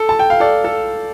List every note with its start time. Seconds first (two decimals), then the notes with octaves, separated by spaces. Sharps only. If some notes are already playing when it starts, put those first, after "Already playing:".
Already playing: A4
0.09 A5
0.19 G5
0.30 F5
0.40 A4 D5
0.64 A4